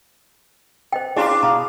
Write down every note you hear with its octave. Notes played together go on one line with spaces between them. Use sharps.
C5 D#5 G5
C#4 D4 E4 F4 G4 G#4
B2 F5 A#5